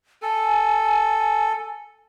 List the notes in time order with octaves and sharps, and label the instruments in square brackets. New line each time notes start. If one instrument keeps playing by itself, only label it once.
[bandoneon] A4 [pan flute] G#5